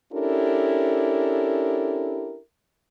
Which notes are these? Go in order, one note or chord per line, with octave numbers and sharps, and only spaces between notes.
C#4 D4 E4 G4 A4 A#4